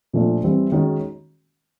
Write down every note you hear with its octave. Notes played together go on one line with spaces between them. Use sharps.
A#2 F3 A3 D4 F4
E3 G3 C4 E4
D#3 G#3 C#4 F#4